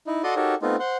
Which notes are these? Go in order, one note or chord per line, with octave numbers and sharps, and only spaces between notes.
D#4 E4
F#4 A4 D5 D#5 C6 D#6
D#4 F#4 G4 A4 A#4 C#5
A3 B3 C4 D#4 F4
C5 F#5 C6